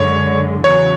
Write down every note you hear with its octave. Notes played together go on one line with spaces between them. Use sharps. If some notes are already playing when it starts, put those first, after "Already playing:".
Already playing: F#2 D3 G#3 C#5
E2 C#3 F#3 C#5